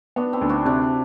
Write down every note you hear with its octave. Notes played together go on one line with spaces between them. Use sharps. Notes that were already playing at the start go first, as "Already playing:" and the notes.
B3 D4 F#4
C4 E4
D2
D4 F#4
C3 D4 F#4